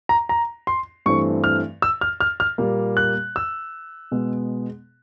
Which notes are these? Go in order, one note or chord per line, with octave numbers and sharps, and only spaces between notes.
A#5
A#5
C6
G2 E3 A3 C4 C#6
F6
E6
F6
F6
F6
A#2 G3 A#3
F#6
E6
B2 G#3 B3